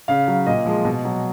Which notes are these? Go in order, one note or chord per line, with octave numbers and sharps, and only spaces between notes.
C#3 F5
F#3
A#2 D#5
F3 G#3
B2
F#3